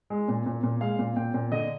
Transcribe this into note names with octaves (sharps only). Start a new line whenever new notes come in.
G#3
A#2
A#2
A#2
G#3 F5
A#2
A#2 G5
A#2
D3 D#5